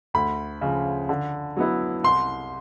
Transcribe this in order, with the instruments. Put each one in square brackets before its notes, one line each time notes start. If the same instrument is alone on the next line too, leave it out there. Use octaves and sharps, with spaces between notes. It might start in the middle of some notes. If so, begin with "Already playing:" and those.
[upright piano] D2 B5
C#3 F3
D3
F#3 B3 E4
C2 C6